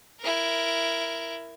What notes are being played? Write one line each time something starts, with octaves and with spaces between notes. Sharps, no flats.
E4 A#4